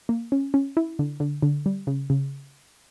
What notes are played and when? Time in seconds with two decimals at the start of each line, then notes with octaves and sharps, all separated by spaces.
0.09 A#3
0.32 C#4
0.54 C#4
0.77 E4
0.99 D3
1.20 D3
1.42 D3
1.66 G3
1.87 C#3
2.10 C#3